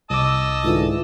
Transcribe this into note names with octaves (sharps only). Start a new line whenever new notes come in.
C2 D#5 A5 D6 E6
G#2 D3 E3 F4